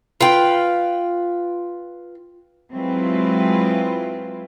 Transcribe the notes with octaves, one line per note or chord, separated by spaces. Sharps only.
F4 B4 G5
F#3 G#3 C4 E4 F4 B4